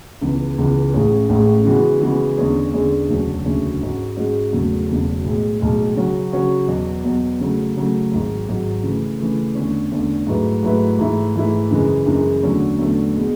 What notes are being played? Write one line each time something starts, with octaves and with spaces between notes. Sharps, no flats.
C#2 C#3 E3 B3
C#2 C#3 E3 B3
A1 A2 G#3 C#4 G#4
A1 A2 G#3 C#4 G#4
C#3 E3 G#3 B3 F#4
C#3 E3 G#3 B3 F#4
E2 D3 G#3 C#4 G#4
E2 D3 G#3 C#4 G#4
E1 D2 C#3 F#3 C#4
E1 D2 C#3 F#3 C#4
G#2 G#3 C#4 F#4
G#2 G#3 C#4 F#4
E1 E2 C#3 F#3 A3
E1 E2 C#3 F#3 A3
B1 A2 G#3
B1 A2 G#3
C#3 F#3 C#4 F#4
C#3 F#3 C#4 F#4
E2 B2 F#3
E2 B2 F#3
C#3 F#3 A3
C#3 F#3 A3
G#1 G#2 F#3
G#1 G#2 F#3
C#3 E3 A3
C#3 E3 A3
E2 D3 A3 C#4
E2 D3 A3 C#4
G#2 F#3 A3 E4 B4
G#2 F#3 A3 E4 B4
G#2 E3 A3 E4
G#2 E3 A3 E4
F#2 C#3 E3 G#3
F#2 C#3 E3 G#3
E2 D3 F#3 A3 C#4
E2 D3 F#3 A3 C#4
B2 G#3 B3